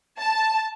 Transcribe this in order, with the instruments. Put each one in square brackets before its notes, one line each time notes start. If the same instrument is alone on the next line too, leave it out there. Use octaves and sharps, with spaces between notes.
[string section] A5